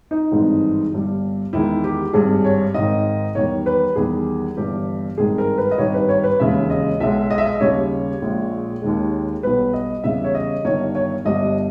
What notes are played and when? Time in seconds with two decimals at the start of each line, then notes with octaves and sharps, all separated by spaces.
0.11 D#4
0.32 G#1 G2 E3 G#3
0.92 G1 G2 G3
1.53 E2 D#3 G#3 E4
1.84 G4
2.13 G#1 G2 G3 G#4
2.45 C#5
2.74 G#1 G#2 D#3 D#5
3.35 E2 D#3 G3 C#5
3.66 B4
3.96 E2 D#3 G3 G#4
4.57 G1 G2 E3 G4
5.18 G#1 G2 D#3 G#3 G#4
5.38 A#4
5.58 B4
5.71 D#5
5.78 G#1 G2 D#3 G3 C#5
5.94 B4
6.09 C#5
6.24 B4
6.40 E1 D#2 C#3 G#3 E5
6.70 D#5
7.00 B1 B2 G#3 E5
7.30 D#5
7.38 E5
7.45 D#5
7.60 D#2 C#3 G3 C#5
8.22 A#1 A#2 G#3
8.82 D#2 D#3 G#3
9.43 B1 B2 G3 B4
9.73 D#5
10.03 E2 C#3 G3 E5
10.24 C#5
10.35 D#5
10.65 G1 G2 D#3 C#5
10.95 C#5
11.25 G1 G2 G3 D#5